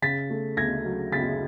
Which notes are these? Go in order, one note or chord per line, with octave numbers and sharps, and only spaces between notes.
C#3 A6 B6
A3
D2 G#6 A#6
F#3
C#3 A6 B6